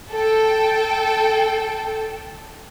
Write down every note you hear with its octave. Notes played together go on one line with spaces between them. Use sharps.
A4 G5